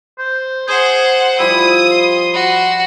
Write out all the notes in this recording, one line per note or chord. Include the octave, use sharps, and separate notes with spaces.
C5
G#4 C5 F#5
F3 G3 E4 D#6
C6
F#4 B5